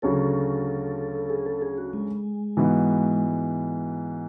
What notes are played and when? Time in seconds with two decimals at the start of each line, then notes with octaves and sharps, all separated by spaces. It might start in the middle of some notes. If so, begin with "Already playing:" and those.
0.02 D2 C#3 F#3 C#4 A4
1.30 G#4
1.46 A4
1.62 G#4
1.78 F#4
1.93 G#3
2.57 G#2 E3 B3 F#4